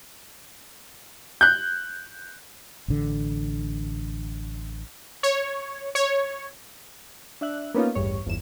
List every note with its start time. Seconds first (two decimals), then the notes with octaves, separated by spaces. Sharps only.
1.41 F#6 G6
2.88 A1 D3
5.23 C#5
5.95 C#5
7.41 D4 E5 F#6
7.74 A#3 B3 C#4 D#4 F4
7.95 A1 E2 G2 C#5
8.26 G1 E2 E7